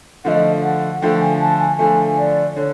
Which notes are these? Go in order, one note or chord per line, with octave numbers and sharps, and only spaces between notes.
D3 F3 A3 D#5 F#5
F#5
D3 F3 A3 G5
G#5
A5
G#5
D3 F3 A3 G#5
D5
D3 C#5